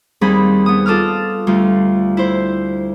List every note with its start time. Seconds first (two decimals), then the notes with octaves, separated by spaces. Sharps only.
0.21 D#2 G3 C4 D#4 G#4 B5
0.66 B3 D#6
0.86 F4 A4 D6 D#6 F6
1.47 D2 G3 F4
2.17 E4 C5